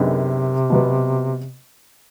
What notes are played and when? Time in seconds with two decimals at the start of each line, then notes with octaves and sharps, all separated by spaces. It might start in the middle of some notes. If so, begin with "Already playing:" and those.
Already playing: F#2 C3 D#3 G#3 B3 D4
0.70 B2 F#3 B3